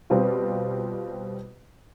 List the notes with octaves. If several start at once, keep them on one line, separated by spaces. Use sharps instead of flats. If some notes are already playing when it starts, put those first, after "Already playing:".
B2 G3 C4 F4